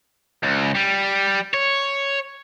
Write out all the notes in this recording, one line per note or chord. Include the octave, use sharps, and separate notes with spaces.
C#2
G3
C#5